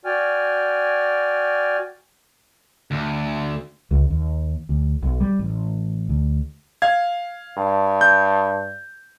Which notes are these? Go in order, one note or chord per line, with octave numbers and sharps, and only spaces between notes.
F#4 D5 G5 G#5 F6
D2
C#2
D#2
D2
B1
G3
A1
D2
F5 G#6
G2
G6